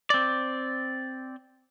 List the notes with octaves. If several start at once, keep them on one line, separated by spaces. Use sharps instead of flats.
C4 D5